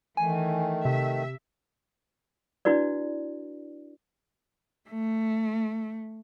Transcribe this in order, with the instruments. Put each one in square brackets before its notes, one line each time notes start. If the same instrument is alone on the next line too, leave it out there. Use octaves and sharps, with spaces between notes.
[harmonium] D#3 A3 [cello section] E3 [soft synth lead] G#5
[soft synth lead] C3 [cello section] E5
[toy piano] D4 E4 F#4 B4 D5
[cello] A3